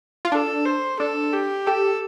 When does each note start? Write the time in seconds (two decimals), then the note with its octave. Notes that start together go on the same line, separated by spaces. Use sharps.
0.25 F4
0.32 D4 A4
0.66 C5
1.00 D4 A4
1.33 G4
1.67 G4 A4